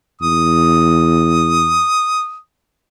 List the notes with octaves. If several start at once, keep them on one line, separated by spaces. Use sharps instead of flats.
E2 D#6